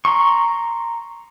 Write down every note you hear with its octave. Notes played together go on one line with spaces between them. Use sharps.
A#5 C6 C#6